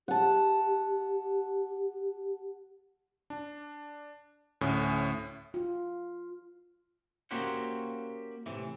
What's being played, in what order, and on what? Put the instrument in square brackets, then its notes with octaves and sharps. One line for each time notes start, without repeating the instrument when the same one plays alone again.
[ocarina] G4 [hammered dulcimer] F#5 A5
[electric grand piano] D4
D2 A2 C#4
[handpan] F4
[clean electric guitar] A#3 C#4 F#4 G4 C5 F#5
A2 C3 E3